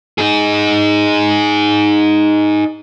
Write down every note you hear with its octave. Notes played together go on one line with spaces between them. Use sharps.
D#4 G#4